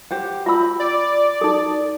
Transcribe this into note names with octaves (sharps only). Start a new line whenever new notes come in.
G4 C5 F#5
F4 E5 B5 E6
D5
D#4 A4